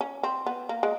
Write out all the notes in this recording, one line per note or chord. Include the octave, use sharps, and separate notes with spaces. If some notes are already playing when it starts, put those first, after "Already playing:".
C#4
C4
B3
A#3
G#3